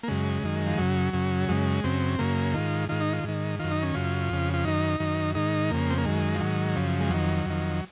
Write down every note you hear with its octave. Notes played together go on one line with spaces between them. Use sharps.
A#3
F#2 C#3 G#3
F#2 D#3
F3
F#2 C#3 F#3
F#2 C#3
F#2 C#3 G#3
F#2 C#3 C4
F#2 C#3 A#3
G#2 D#3 F4
G#2 D#3 F4
D#4
F4
G#2 D#3
F#2 D#3 F4
D#4
C#4
F#2 C#3 F4
F2 C#3
F4
F#2 D#3 D#4
F#2 D#3
G#2 D#3 D#4
F2 C#3 A#3
C4
A#3
F#2 D#3 G#3
F3
G#2 D#3 F#3
F#2 C#3 F3
G#3
F2 D#3 F#3
F2 D#3